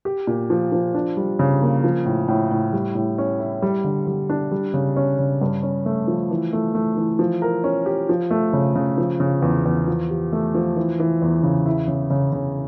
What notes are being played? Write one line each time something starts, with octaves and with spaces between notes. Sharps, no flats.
G4
A#2
F3
F3
D4
G3
C#3
A#3
F3
A2
A2
A2
G3
A2
C#4
E4
G3
D3
G3
D4
G3
C#3
C#4
C#3
G2
C#4
A3
F3
E3
A3
A3
E3
F3
A#4
C#4
G4
F3
A3
C#3
C#3
F3
C#3
E2
E2
F3
G4
A3
F3
E3
E3
E2
C#3
E4
C#3
C#3
C#3